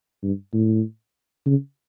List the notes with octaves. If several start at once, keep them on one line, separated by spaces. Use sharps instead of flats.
G2
A2
C#3